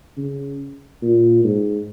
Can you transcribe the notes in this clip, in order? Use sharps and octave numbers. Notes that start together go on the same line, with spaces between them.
C#3
A#2
G#2